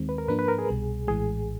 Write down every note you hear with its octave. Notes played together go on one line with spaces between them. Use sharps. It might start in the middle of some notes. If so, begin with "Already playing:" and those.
Already playing: D#2 D#3 G#3 C4
B4
A#4
G#2 F3 A#3 D4 B4
B4
A#4
G#4
C2 B2 G3
A#1 A2 E3 G#3 G#4